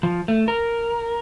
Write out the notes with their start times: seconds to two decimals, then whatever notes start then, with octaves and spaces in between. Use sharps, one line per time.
0.03 F3
0.28 A3
0.48 A#4